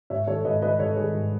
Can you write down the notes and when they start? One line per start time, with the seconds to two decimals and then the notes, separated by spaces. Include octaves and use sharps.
0.10 G#2 C#5 E5
0.27 D#3 A4 C#5
0.45 G#2 B4 D#5
0.62 D#3 B4 D#5
0.79 G#2 A4 C#5
0.96 D#3 G#4 B4
1.14 G#2